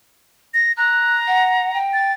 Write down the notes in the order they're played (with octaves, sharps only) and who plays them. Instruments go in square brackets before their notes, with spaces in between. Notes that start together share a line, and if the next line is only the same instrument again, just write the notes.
[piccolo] A#6
[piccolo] A#5 [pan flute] F#6
[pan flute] F#5
G5
[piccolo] A6